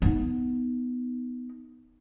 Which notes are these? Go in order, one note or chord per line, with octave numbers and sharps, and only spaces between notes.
B3 D#4